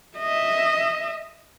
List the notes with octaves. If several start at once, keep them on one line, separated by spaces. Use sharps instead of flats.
D#5 E5